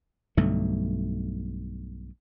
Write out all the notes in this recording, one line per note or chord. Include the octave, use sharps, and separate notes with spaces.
B1 G2 D3 A3